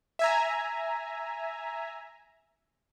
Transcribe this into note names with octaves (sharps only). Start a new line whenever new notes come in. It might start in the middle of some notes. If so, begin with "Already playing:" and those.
E5 G#5 A#5